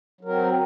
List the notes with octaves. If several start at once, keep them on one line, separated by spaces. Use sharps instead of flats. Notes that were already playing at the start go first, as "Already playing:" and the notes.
F#3 C4 A#4